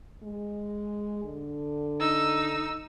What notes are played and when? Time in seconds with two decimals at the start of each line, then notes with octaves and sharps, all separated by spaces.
0.23 G#3
1.24 D3
2.00 D#4 E6